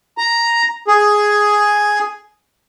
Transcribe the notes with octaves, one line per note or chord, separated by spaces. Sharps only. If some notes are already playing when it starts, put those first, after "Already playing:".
A#5
G#4